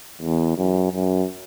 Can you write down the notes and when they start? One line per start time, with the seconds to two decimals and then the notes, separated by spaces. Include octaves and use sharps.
0.22 E2
0.57 F#2
0.93 F#2